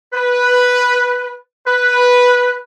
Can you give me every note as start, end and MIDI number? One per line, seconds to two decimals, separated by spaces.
0.13 1.32 71
1.67 2.55 71